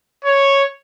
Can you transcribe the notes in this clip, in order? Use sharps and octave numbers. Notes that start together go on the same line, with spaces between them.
C#5